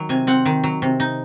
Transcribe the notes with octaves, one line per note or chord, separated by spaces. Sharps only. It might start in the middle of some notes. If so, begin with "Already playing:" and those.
Already playing: D#3 F#3
C3 G#5
C4 F#5
D#3
F#3
C3
D#4